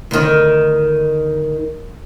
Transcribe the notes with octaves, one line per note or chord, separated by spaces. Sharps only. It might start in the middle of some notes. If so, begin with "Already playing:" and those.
D2 D#3